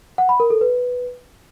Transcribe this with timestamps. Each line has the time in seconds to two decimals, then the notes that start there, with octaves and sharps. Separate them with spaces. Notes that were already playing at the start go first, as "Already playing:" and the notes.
0.18 F#5
0.29 B5
0.40 A#4
0.50 A4
0.61 B4